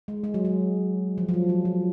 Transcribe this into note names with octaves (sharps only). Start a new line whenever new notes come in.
G#3
G#3
F#3
F#3
F3
F3
F#3
F#3
F#3